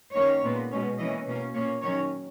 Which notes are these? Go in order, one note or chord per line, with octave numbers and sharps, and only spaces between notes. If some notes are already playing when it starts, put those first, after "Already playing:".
D#3 A#3 C#4 C#5
A#2 G#3 B3
B2 G#3 C#4
E3 A#3 C#4 D#5
B2 A#3 C#4
A#2 A#3 C#4 C#5
D#3 F#3 C#4 C#5